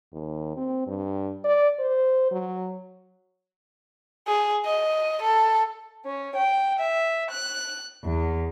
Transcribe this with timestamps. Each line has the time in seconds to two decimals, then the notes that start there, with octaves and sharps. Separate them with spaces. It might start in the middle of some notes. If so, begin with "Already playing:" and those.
0.12 D#2
0.57 C4
0.87 G2
1.44 D5
1.79 C5
2.31 F#3
4.28 G#4
4.66 D#5
5.23 A4
6.06 C#4
6.35 G5
6.79 E5
7.30 F#6
8.03 E2